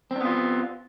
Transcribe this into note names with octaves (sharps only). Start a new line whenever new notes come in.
B3 C4 D4 F4